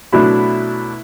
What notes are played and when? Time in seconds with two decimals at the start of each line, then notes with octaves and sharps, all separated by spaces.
0.13 B2 F#3 A3 D4 E4